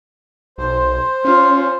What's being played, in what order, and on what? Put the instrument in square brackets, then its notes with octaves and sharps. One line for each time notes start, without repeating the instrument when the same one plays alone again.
[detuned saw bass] B1 [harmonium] C5
[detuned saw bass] C#4 [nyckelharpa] F4